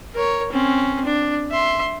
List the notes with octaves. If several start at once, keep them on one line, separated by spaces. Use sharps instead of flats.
A#4 C#5
C4 C#4
D4
E5 C6